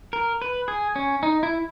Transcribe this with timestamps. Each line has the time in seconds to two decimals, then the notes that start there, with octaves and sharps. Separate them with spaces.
0.13 A#4
0.42 B4
0.68 G#4
0.96 C#4
1.23 D#4
1.43 E4